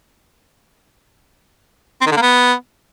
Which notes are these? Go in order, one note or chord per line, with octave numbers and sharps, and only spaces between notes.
C4
D#3
D3
A#3
B3